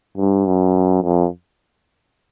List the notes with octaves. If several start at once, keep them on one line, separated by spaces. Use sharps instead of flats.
G2
F#2
F2